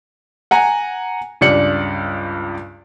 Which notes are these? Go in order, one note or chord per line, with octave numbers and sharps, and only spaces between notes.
F#5 G#5 A#5
C#2 G2 D5 C#7 F#7